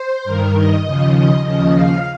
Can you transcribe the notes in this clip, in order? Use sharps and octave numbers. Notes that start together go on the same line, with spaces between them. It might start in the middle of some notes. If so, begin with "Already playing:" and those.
Already playing: C5
G2 D#3 A#4
D#5
D#2 C#3 F3
D#5
D#2 C#3 F3 D#5
F5